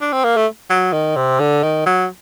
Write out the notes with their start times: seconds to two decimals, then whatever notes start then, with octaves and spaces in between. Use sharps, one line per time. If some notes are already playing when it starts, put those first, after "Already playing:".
0.02 D4
0.13 C4
0.24 A#3
0.37 A3
0.70 F#3
0.93 D#3
1.16 C3
1.40 D3
1.63 D#3
1.86 F#3